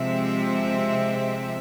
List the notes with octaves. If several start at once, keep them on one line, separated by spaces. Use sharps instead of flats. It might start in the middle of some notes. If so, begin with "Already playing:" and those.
Already playing: C3 F3 G#3 C4 E5